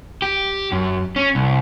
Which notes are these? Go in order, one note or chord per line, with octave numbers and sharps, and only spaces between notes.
G4
F#2
C#4
C2